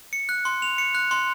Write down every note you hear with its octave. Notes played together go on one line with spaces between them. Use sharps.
C#7
F#6
C6
F7
C#7
F#6
C6